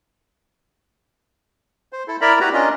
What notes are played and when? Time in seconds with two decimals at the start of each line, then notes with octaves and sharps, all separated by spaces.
1.93 C5
2.08 E4 A4
2.21 E4 A#4 D5 E5 A#5 B5
2.40 E4 F#4 G4 B4 A#5
2.53 C#4 D4 F4 A#4 D#5